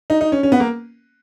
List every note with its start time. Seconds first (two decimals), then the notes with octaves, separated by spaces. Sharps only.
0.10 D#4
0.21 D#4
0.32 C#4
0.43 C#4
0.52 B3
0.60 A#3